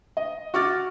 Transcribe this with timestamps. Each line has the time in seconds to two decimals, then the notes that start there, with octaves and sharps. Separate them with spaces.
0.17 D#5
0.54 F#4 D6 F6 A6